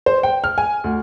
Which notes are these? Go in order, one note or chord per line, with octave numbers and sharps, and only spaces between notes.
C5
G5
F6
G#5
D2